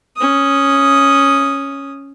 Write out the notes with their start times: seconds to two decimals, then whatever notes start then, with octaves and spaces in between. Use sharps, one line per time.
0.17 C#4 D#6